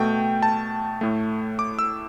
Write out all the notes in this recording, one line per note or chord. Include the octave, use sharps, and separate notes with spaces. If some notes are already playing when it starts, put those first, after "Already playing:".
Already playing: B2 A3 G5
A5
A2 A3
D6
E6